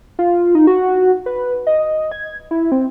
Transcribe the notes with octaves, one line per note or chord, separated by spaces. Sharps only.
F4
D#4
F#4
B4
D#5
G#6
E4
C4